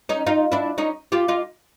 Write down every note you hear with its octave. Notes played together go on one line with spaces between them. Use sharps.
C#4 D#4
D#4 F4
D4 E4
C#4 D#4
F4 G4
D#4 F4